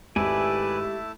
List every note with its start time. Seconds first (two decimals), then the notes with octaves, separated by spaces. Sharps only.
0.16 G#1 A3 E4 G4 B4 D5 G#5 A5